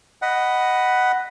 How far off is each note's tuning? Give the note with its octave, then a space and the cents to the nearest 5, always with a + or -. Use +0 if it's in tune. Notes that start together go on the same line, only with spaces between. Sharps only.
D#5 +0 F#5 +10 B5 +0